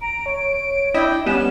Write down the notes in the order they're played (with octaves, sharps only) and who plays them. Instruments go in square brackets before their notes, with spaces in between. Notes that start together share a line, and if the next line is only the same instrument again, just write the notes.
[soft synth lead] A#5 [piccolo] D7
[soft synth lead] C#5
[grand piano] D4 D#5 [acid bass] E4 [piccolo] G5
[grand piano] G3 C#4 [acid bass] B3 [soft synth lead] G#5 [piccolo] E7